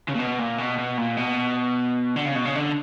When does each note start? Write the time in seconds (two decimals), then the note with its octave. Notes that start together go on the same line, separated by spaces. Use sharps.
0.09 C#3
0.15 A#2
0.19 B2
0.39 A#2
0.58 B2
0.78 B2
0.98 A#2
1.17 B2
2.16 D3
2.26 C#3
2.35 B2
2.45 C#3
2.56 D3